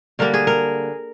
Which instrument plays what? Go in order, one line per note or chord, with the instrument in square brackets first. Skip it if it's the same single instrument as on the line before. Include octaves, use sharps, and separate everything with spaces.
[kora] D3 G3 A#3 A#4
G#4
A#4